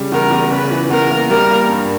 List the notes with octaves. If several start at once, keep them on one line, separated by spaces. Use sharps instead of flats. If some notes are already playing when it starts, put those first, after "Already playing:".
Already playing: C#3 G3
E2 A#4
E2
C#3 B4
E3
E2 A#4
A#3
G3 A#4
A#3
G2